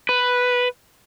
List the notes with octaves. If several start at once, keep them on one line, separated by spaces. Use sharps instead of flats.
B4